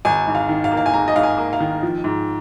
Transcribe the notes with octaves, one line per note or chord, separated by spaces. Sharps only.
G#1 G#5
G#2
F5
D#3
F5
A#3
F5
G#5
G#2 A#5
D#5
G#2 F5
G#5
A#3
F5
D#3
F3
G#2